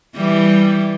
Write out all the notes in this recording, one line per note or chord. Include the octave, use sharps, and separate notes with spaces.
E3 G3